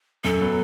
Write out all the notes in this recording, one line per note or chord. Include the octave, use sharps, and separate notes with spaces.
F#2 A4
F#3 B3